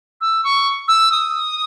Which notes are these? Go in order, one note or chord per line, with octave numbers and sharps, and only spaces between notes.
E6
C#6
E6
D#6